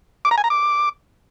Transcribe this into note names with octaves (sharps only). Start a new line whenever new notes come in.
D6
A#5
G#5
A#5
D6